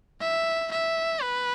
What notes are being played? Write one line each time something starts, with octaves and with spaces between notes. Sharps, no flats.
E5
E5
B4